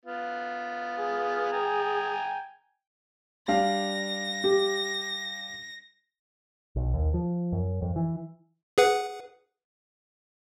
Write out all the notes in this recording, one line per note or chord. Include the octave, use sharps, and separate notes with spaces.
B3 F4
G#4
G5 G#5 A#5
G3 D4 F5 A#6
G4
B1
D#2
F3
F#2
F2
E3
G#4 B4 F#5